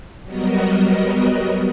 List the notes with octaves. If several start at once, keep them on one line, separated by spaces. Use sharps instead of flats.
F#3 G3 B3 F#4 A#4 D#5